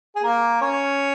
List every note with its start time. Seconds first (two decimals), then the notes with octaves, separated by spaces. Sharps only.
0.16 G#4
0.23 A#3 A#4
0.61 C#4 C#5